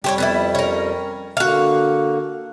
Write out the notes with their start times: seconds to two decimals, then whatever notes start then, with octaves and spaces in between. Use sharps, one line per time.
0.04 F2 G3 G4 C5 C#5
0.18 B3 C#4 E4
0.55 C#4 A#4
1.37 D3 A#3 F#4 F5